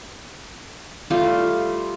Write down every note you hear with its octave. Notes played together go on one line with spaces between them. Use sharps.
G3 A3 F4 G4